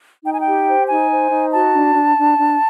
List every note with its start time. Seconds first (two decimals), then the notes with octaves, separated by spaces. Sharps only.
0.24 D#4 G5
0.33 G#5
0.41 G4 G5
0.67 C5
0.88 D#4 G#5
1.10 C5
1.31 D#4
1.52 F#4 A5
1.74 D4
1.95 D4
2.17 D4
2.37 D4